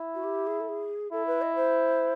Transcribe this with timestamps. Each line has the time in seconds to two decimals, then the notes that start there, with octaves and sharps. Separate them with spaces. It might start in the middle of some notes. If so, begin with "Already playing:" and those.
Already playing: E4
0.14 F#4
0.24 G4
0.46 G#4
0.60 A4
0.68 G#4
1.12 E4 A4
1.27 B4
1.41 D#5
1.55 C5